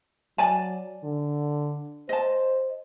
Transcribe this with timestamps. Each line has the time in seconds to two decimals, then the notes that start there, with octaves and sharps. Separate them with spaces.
0.38 F#3 D5 G#5 A5
1.04 D3
2.09 C5 D#5 A5